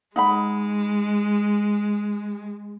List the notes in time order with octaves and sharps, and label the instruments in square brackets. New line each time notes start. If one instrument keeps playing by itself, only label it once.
[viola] G#3 [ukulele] D#4 F#5 B5